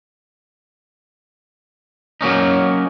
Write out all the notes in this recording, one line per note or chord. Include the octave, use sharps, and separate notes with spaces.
F#3 A#3 C#4 D#4